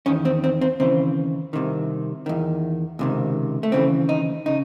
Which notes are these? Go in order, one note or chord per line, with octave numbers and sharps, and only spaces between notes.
E2 D#3 C#4
C4
C4
C4
D#2 C#3 E3 C4
C2 C3 D#3
E2 D#3
C#2 C3 D#3
A3
D#2 C#3 E3 C4
D#4
C#3 D#4